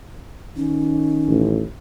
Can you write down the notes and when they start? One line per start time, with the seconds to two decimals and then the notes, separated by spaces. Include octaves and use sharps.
0.56 D#3 C#4
1.28 A1